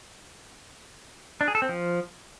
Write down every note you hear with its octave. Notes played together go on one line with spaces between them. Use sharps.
D4
G#4
A4
C4
F3